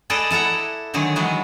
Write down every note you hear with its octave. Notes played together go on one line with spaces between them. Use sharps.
G#4 A4 B4 D5 D#5
E4 A4 F#5 A#5
D3 D#3 F#3 G#4
D#3 E3 F#3 G#3 B3